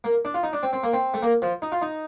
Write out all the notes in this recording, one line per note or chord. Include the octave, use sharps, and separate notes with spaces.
A#3
D4
F4
D#4
D4
C4
C4
A#3
C4
A3
A#3
F3
D#4
F4
D#4